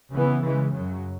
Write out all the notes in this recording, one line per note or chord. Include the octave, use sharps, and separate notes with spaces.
C#3 E3 B3
C#3 E3 G#3
F#2 C#3 F#3